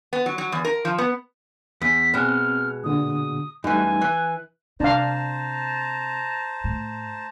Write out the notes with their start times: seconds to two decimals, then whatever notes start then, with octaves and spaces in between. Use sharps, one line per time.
0.13 B3
0.26 F#3
0.38 F#3
0.52 E2
0.65 A#4
0.85 F3
0.98 B3
1.82 E2 B6
2.14 B2 G#3 C4 F6
2.84 A#2 D3 D#6
3.64 F#2 E3 G3 A3 D#4 G#5
4.01 E3 F#6
4.80 C3 D4 C5 F5 A5 A#5
6.64 A2